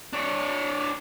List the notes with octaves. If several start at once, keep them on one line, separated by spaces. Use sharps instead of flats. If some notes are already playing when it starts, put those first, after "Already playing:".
D4 C#5